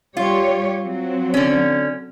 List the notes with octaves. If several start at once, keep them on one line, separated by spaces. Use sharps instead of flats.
G3 F4 G4 C#5
F#3 C4
D3 C#4